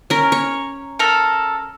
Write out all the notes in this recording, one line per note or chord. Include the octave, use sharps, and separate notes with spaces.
C#4 A#4
C#5
A4 A#4